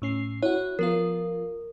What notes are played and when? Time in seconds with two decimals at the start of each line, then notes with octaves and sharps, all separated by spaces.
0.02 A2 C#4 C7
0.43 E4 F#4 C#5
0.79 F3 B3 F4 A#4